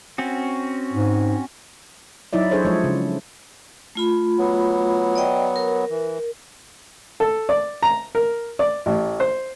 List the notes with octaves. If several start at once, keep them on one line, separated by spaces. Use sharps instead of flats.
C4 C#4 F#4
G#2
F#3 D#4 E4 D5 E5
F#3 D4 G#4 A4 C5 C#5
F3 G#3 C#5
C#3
A3 F4 B5
F#3 B3
D5 D#5 G5
A#4
E3
A4
D5
A#5
A#4
D5
A1
C5